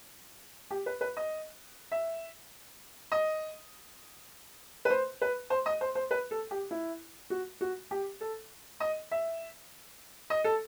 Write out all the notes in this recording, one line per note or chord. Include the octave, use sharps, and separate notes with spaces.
G4
B4
B4
D#5
E5
D#5
B4
C5
B4
C5
D#5
C5
C5
B4
A4
G4
E4
F#4
F#4
G4
A4
D#5
E5
D#5
A4